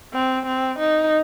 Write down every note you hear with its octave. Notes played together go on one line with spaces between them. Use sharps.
C4
C4
D#4